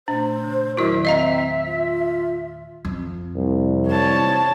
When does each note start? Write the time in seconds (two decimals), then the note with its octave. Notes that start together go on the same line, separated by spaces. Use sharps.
0.08 A#2 A3 D4 C5
0.44 C#3
0.77 E2 D#3 F#3 E4 F#4 A#4 E5
1.05 C4 D#5 F5 A#5
1.65 F4
2.85 F2
3.36 C2
3.88 C#5 A5